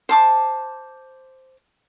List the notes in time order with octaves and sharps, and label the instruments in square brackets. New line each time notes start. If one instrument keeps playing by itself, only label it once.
[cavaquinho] C5 A5 D6